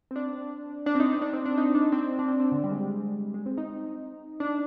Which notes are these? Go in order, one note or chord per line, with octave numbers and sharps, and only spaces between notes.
C4
D4
D4
C4
D#4
D4
D#4
D4
C4
D4
D#4
D4
C4
D4
C4
C4
D3
G3
G#3
G3
G#3
C4
D#4
D4